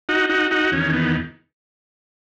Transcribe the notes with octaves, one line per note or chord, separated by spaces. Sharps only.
D#4 F#4
D#4 F#4
D#4 F#4
E2 D#3 C#4
B3